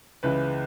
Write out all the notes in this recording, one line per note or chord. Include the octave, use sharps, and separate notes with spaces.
C#2 C#3 E3 B4